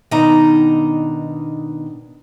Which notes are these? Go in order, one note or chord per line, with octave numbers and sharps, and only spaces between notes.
B2 D#3 D4 D#4 D#5 A#5